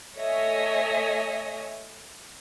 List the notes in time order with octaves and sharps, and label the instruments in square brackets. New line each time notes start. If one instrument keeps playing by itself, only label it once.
[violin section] A3 C#5 D#5 E5 G#5 A#6